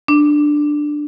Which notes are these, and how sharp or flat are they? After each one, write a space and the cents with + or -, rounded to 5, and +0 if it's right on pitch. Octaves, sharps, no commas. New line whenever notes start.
D4 +10